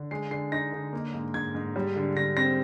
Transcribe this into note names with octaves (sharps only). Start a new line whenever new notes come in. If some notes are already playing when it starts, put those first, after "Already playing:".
Already playing: D3
G#3 C7
D3 C7
D#4 A#6
D3
A#3
G#2
G#2 G#6
G#2
G3
D3
D3 A#6
C4 A#6